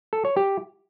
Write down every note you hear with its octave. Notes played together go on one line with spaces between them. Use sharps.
A4
C#5
G4